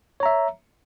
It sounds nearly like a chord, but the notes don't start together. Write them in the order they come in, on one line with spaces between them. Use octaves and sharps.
C#5 A#5 E5